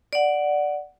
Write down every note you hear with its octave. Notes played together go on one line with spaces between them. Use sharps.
D5 F#5